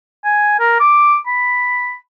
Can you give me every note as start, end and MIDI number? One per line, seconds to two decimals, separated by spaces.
0.25 0.55 80
0.59 0.76 70
0.80 1.18 86
1.27 1.96 83